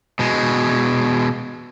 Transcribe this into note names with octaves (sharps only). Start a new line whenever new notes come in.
B2 G#3